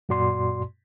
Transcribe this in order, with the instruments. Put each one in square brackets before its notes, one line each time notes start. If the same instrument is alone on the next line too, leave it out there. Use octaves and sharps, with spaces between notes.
[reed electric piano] F#2 A#2 F#4 D5 C6